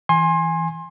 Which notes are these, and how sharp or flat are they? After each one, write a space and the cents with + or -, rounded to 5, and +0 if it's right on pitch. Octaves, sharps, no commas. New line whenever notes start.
E3 +0 G#5 -5 C6 +25